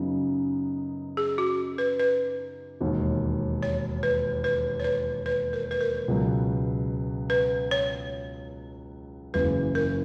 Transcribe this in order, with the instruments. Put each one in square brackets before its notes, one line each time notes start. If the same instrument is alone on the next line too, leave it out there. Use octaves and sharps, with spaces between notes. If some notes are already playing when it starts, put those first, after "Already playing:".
Already playing: [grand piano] F#2 C#3 F#3 B3 D#4
[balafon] G#4
F#4
B4
B4
[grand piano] E1 D#2 D#3
[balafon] C#5
B4
B4
C#5
B4
B4
A#4
B4
A#4
[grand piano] C#2 B2 F#3
[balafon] B4
C#5
[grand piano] F#1 E2 C#3 [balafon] B4
[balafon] A#4